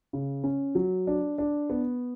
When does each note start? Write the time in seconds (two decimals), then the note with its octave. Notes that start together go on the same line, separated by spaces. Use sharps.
0.13 C#3
0.44 C#4
0.75 F#3
1.07 D4
1.38 D4
1.70 B3